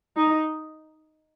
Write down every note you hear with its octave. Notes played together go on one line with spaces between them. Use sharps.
D#4